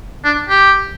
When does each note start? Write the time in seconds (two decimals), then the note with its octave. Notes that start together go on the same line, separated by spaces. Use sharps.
0.25 D4
0.50 G4